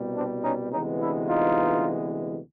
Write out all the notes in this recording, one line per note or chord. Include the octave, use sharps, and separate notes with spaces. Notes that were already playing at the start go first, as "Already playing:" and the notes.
Already playing: C2 B2 G3
C4 D4
C#4 D#4
D2 C3 E3 G#3 B3 C#4 D#4
D4 E4
D#4 F4